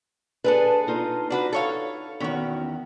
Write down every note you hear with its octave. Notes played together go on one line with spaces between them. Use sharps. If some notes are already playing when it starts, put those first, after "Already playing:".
D4 G#4 A4 B4 A5
D#4 F4 D#5
D4 F#4 B4
A4 C#5 F5
E2 D#3 C#4 F#4